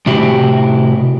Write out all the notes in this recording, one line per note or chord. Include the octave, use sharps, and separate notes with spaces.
A2 C3 E4 F#4 G4